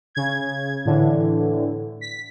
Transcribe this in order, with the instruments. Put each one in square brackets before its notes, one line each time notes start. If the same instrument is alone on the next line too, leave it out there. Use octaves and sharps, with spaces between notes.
[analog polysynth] C#3 G#6
A2 D3 E3
B6